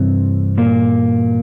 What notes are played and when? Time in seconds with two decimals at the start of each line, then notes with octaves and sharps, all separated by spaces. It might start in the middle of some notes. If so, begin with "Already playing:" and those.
Already playing: G2 C3 E3 C4
0.58 A#2 A#3